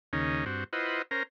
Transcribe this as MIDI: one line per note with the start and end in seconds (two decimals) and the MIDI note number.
0.13 0.45 39
0.13 0.45 49
0.13 0.45 61
0.13 0.45 63
0.46 0.64 43
0.46 0.64 60
0.46 0.64 66
0.73 1.02 64
0.73 1.02 65
0.73 1.02 71
0.73 1.02 72
0.73 1.02 75
0.73 1.02 78
1.11 1.23 61
1.11 1.23 70
1.11 1.23 72
1.11 1.23 82